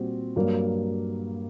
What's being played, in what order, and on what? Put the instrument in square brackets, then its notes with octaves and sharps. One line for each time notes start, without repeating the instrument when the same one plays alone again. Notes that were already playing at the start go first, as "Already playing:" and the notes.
Already playing: [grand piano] A#2 G3 C4 F#4
G2 F#3 A#3